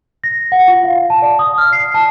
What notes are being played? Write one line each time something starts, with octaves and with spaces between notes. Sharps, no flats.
A#6
F#5
F4
F5
A5
D5
D#6
F6
C7
A5